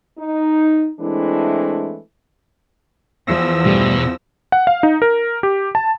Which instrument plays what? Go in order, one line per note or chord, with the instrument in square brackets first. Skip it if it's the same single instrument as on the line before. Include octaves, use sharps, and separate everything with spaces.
[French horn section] D#4
E3 G#3 A3 C4 D4 E4
[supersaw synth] E2 E6 A#6 [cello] F3
[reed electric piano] G2 G3 A3 [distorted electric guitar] B2
[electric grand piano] F#5
F5
D#4
A#4
G4
A5